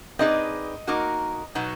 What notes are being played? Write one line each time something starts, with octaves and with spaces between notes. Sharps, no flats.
C4 D#4 G#4 B4 D5 D#5
A#3 D#4 F#4 A#4
B2 F#3 B3 D#4